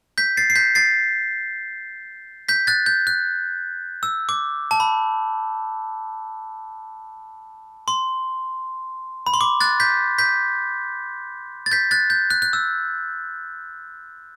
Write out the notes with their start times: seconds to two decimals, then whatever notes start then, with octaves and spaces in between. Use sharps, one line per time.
0.18 G6 B6
0.37 A6 C7
0.50 C7
0.55 G6 B6
0.75 A6 C7
2.49 G6 B6
2.67 F#6 A6
2.86 G6
3.07 F#6
4.03 E6
4.29 D6
4.71 A5
4.80 B5
7.88 C6
9.27 B5
9.34 C6
9.41 D6
9.61 F#6 A6
9.80 G6 B6
10.18 G6 B6
11.66 A6
11.72 G6 B6
11.91 F#6 A6
12.10 G6
12.30 F#6
12.42 F#6
12.53 E6